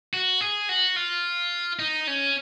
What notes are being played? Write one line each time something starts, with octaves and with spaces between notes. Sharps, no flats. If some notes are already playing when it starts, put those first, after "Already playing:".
F#4
G#4
F#4
F4
D#4
C#4